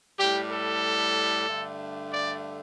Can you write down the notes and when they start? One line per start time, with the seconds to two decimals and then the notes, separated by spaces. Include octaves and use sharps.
0.18 A2 G3 G4
0.51 A4
1.47 G2 D3 A3
2.12 D5